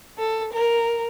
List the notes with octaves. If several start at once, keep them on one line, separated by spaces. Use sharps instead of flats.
A4
A#4